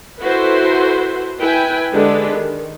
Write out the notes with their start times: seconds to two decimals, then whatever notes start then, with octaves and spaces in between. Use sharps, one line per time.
0.22 E4 F#4 A4 B4 C5
1.41 E4 B4 G5 G#5
1.93 D3 G#3 D4 G4 A4 B4
2.35 D#3